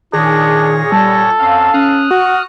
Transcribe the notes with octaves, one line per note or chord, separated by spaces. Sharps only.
A#2 D#3 D4 G#4 C#5 A#6
G3 A4 A5
F#2 C4 F5
C#4 D#6 F6 F#6
F#4 F#5